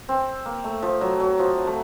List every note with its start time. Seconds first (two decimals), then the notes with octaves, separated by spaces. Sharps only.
0.09 C4
0.46 A#3
0.64 A3
0.82 F3
1.01 F#3
1.20 F#3
1.39 F3
1.58 F#3
1.67 A3